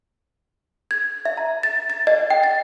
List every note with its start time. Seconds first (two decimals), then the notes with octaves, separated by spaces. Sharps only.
0.91 G#6
1.25 E5
1.37 A#5
1.63 A6
1.90 A6
2.07 D#5
2.30 G5
2.43 A6